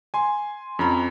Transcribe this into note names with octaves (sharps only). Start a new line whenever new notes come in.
G#5 C6
F2 C#4 A#5 B5